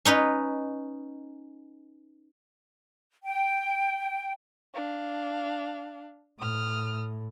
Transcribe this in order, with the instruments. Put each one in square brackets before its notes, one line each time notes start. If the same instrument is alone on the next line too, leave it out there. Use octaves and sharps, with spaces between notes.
[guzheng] C#4 D#4 B4 D#5
[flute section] G5
[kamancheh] D4 F5
[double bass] A2 [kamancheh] D#6 F6